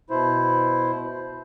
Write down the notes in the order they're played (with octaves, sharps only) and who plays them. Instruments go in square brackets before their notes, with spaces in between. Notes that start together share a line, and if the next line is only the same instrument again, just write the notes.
[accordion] B2 E4 C5